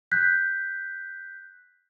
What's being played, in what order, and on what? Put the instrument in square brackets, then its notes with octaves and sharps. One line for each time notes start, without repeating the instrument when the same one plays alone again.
[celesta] F#6 G6 B6